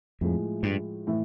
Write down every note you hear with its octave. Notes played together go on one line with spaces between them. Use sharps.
F2 A2 F3 G#3
G2
A2 E3